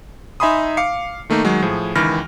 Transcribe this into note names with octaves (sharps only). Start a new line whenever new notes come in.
D#4 E5 G#5 B5 C6 D#6
F5 D6 C7 C#7
D#3 A3 A#3 D#4
D#3 F#3 G#3
A2 F3 G#4
C#2 D#3 E3 B5 F6 A#6